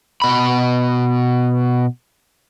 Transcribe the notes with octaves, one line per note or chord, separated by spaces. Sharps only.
B2 B5